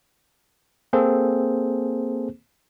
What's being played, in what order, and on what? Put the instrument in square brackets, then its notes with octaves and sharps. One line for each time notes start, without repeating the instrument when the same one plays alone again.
[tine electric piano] A#3 C4 G#4 A4 C5